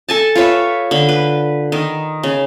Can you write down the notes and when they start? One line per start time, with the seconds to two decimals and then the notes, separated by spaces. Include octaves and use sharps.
0.09 A4 G#5 A5
0.35 F4 B4 C#5 E5
0.91 D3 B5
1.09 B4
1.72 D#3
2.23 C#3